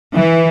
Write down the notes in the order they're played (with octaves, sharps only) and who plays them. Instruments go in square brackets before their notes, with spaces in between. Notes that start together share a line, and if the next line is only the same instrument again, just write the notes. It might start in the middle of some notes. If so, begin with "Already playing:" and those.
[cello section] E3